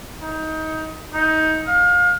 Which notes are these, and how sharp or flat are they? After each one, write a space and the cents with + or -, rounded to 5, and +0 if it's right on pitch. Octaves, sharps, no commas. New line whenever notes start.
D#4 +20
D#4 +20
F5 +30